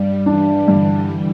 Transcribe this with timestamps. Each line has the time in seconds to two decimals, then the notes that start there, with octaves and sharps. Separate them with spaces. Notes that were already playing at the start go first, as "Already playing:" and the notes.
Already playing: G2 G3
0.26 E3 D4
0.68 G2 D3